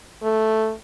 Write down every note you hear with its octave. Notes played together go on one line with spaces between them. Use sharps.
A3